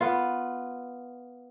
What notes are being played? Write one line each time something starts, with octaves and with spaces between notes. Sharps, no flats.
B3 F4